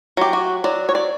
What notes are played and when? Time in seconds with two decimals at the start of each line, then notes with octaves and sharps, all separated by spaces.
0.17 F#3 G4
0.33 F#4
0.64 F#3 D5
0.89 C#5
0.95 D5